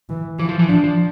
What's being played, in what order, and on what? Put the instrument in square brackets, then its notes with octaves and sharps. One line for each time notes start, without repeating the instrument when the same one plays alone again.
[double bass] E3
[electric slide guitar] E3 [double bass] F3
[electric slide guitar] F3
E3
[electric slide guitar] F3 [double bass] D4
[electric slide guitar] F3